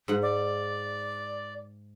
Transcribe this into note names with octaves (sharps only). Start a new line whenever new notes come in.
G#2 F#5
D5